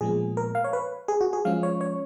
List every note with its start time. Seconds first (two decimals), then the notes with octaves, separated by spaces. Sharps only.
0.01 A#2 F3 G#3 B3 G#4
0.37 A#4
0.55 F5
0.64 C#5
0.73 B4
1.08 G#4
1.21 F#4
1.33 G#4
1.45 F3 G#3 C#4 F5
1.63 C#5
1.81 C#5